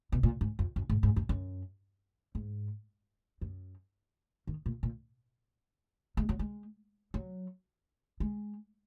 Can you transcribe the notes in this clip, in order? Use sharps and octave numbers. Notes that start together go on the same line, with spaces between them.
B2
A#2
G#2
F2
F#2
G#2
G#2
F#2
F#2
G#2
F#2
D#3
A#2
A#2
G#3
F#3
G#3
F#3
G#3